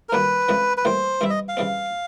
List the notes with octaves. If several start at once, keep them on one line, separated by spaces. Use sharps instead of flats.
A#4
G2 D#3 F#3 A#3 D4 B4
F2 C#3 E3 G#3
B4
A2 E3 G3 A#3 C5
G2 E3 G3 C4 E4 E5
D#5
F5
C#3 E3 G3 C4